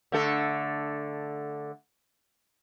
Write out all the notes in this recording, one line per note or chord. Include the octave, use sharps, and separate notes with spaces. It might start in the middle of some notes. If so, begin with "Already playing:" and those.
D3 A3 A4